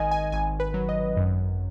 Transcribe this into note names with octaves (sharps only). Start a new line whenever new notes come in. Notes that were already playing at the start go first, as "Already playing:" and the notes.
Already playing: G#1 D#3 D#5 G#5
G#5
G#1 G#5
B4
F#3
D#5
F#2